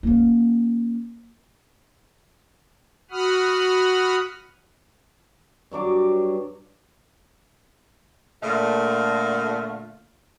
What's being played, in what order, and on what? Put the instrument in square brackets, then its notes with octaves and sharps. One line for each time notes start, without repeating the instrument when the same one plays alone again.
[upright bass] A#3 C#4
[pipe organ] F#4 F#5 B5 D#6 F6
[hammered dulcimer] G2 F#3 D4 D6
[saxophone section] A#2 D3 A3 F4